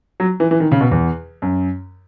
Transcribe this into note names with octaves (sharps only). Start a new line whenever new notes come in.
F#3
E3
E3
D#3
C#3
B2
E2
F#2